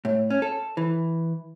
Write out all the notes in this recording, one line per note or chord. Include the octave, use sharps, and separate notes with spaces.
A2
C#4
A4
E3